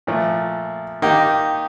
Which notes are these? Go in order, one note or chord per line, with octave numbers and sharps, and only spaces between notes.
A#2 F3 A3
D#3 A#3 D#4 G4